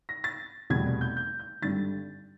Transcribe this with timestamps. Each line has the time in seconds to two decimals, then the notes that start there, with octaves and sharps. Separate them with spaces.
0.09 A#6
0.24 A6
0.70 F1 E2 B2 G3 G#6
1.01 G6
1.17 G6
1.39 G6
1.62 G#1 G2 D3 G3 A6